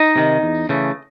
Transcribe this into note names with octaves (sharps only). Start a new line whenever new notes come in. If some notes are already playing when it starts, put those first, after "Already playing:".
Already playing: D#4 D#5
C3 D#3
E2
C#3 E3 A3